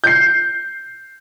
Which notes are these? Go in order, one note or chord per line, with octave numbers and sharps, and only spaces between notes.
G6 C7